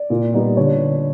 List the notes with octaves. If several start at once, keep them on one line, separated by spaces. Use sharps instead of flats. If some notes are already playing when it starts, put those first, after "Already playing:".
Already playing: D5
A#2
G3 B3 D#4
D3 C#5